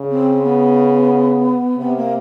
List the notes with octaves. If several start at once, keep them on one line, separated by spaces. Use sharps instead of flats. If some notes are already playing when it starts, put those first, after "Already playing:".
Already playing: C#3
C4
B3
C3 B3
A#3